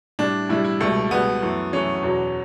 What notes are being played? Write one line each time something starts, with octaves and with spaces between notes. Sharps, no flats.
A2 G3 D4
A2 G3 E4
E4
C#2 B2 G3 A3
C#2 B2 G3 B3
F#2 E3 A3
F#2 E3 A3 C#4
E2 B2 F#3